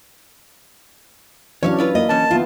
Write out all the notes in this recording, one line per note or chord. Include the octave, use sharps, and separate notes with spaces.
E3 F#3 C#4 D4 C#5 E5 F5
E4 F4 B4
A#3 D#5
E3 C#4 A5
D#3 B3 E4 F4